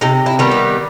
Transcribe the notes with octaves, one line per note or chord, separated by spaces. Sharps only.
C3 D#4
E4
D#3 G3 B3
E4